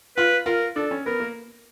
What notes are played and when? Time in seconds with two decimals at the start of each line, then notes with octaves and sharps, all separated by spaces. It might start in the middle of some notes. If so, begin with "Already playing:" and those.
0.17 F4 B4
0.46 F4 A#4
0.76 D4 A4
0.91 C#4
1.06 B3 A#4
1.20 A#3